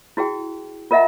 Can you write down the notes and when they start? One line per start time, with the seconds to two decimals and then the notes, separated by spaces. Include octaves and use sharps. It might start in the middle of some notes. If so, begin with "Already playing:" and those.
0.17 E4 F#4 G#4 G5
0.91 F4 A#4 D#5 E5 F#5 A#5